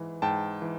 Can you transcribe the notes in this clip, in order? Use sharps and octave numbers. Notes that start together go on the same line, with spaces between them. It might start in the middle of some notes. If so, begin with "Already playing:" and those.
Already playing: G#2 E3
G#2 G5 A5
E3